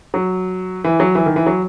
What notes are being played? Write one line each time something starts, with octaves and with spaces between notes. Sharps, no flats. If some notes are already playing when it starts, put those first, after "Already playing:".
F#3
E3
F#3
E3
D#3
E3
F#3